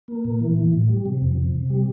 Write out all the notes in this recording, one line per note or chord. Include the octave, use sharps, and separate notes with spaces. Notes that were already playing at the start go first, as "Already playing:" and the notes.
A#3
A#2
E3
E3
A2
G3
C3
F2
C3
C3
G3